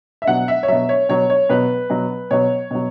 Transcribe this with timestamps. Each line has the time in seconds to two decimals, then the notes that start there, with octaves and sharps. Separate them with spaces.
0.22 E5
0.27 B2 F#3 F#5
0.48 E5
0.63 C#5
0.68 B2 F#3 E5
0.89 C#5
1.09 B2 F#3 C#5
1.30 C#5
1.49 B2 F#3 B4
1.90 B2 F#3
2.31 B2 F#3 C#5
2.71 B2 F#3